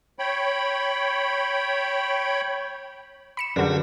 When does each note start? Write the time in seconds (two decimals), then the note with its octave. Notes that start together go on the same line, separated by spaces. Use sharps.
0.19 C#5 G5 B5
3.37 B5 C#7 E7
3.56 F#2 D3 G3 D4 F#4 G#4 A#4 B4